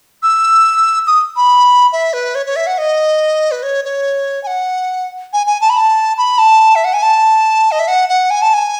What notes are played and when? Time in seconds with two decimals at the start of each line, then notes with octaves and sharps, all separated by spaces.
0.23 E6
1.07 D#6
1.36 B5
1.92 E5
2.13 B4
2.35 C#5
2.46 C#5
2.56 E5
2.67 F#5
2.78 D#5
3.51 B4
3.63 C#5
3.84 C#5
4.43 G#5
4.47 F#5
5.33 G#5
5.47 G#5
5.61 A5
5.70 B5
5.78 A5
6.18 B5
6.38 A5
6.75 E5
6.84 F#5
6.94 G#5
7.02 A5
7.72 D#5
7.79 E5
7.88 F#5
8.09 F#5
8.30 G#5
8.42 A5
8.54 G#5